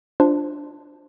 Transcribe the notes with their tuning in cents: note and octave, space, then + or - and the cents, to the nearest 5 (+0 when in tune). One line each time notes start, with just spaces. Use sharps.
D4 +0 F4 +0 C5 +0